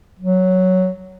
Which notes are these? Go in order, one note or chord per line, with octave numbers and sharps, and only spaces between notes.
F#3